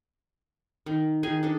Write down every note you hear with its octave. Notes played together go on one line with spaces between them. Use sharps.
D#3
D#3 G#4 G#5
D4 A4